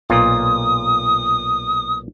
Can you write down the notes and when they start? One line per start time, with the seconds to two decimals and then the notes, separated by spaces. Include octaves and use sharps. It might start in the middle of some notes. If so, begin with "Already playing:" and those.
0.10 B1 A#2 F4 D#6